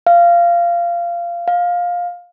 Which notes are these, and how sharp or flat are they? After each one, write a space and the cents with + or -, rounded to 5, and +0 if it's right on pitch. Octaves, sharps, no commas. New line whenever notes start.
F5 -20
F5 +15